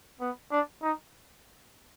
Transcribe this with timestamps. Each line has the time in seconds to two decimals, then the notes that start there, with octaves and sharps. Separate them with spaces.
0.21 B3
0.51 D4
0.82 D#4